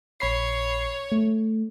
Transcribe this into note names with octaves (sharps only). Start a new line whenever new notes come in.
A#1 C#5 B5 C7
A3